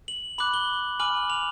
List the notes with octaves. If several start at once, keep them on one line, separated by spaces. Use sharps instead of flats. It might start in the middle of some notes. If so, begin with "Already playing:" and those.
F#7
B5 D6 F#6 F#7
G7
G#5 B5 D6 F6 F#7
F7